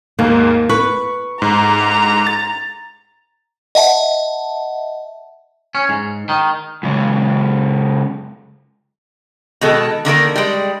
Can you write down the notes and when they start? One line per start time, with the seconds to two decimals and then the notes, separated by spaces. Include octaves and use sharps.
0.19 D#2 G#2 A#3
0.70 B4 C#6
1.42 G#2 A#5
2.27 A6
3.75 D#5 E5 F#5 A5
5.75 C#4
5.89 G#2
6.29 D#3
6.83 F#2 C#3 G#3
9.61 B2 D#3 G#3 A4
10.05 D3 D#3 A#3 A#4
10.35 G3 G#3